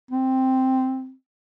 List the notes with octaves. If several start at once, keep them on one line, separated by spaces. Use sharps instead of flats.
C4